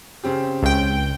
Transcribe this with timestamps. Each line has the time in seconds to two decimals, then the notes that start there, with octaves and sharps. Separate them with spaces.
0.24 C#3 C4 G4
0.63 C#2 G5